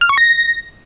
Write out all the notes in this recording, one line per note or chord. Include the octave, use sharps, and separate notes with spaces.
F6
C#6
A#6